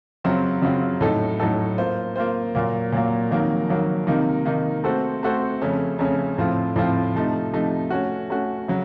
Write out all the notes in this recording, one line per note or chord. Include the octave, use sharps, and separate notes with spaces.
F#2 C#3 F#3 C4 F4
F#2 C#3 F#3 C4 F4
A2 F#3 A3 D#4 A4
A2 F#3 A3 D#4 A4
A#3 F4 C5
A#3 F4 C5
A#2 F#3 A#3
A#2 F#3 A#3
F2 D#3 F#3 A#3
F2 D#3 F#3 A#3
C3 D#3 A#3 D#4
C3 D#3 A#3 D#4
A3 C4 F#4 A4 C5
A3 C4 F#4 A4 C5
F2 C#3 A3 C#4
F2 C#3 A3 C#4
A2 F3 C4 F4
A2 F3 C4 F4
C3 F3 A3 D#4
C3 F3 A3 D#4
A3 C#4 F#4
A3 C#4 F#4
C#3 F#3